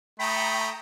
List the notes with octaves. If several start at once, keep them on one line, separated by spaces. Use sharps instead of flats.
A3 G5 A#5 B5 D#6